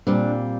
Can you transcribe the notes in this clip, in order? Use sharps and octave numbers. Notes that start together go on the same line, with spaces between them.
A#2 G3 C4 D4